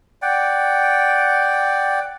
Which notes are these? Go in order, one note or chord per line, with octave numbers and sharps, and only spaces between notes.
D5 F#5 G5